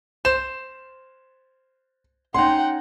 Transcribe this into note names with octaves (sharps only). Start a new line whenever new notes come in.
C5 E7
C#4 D#4 F#5 G5 C6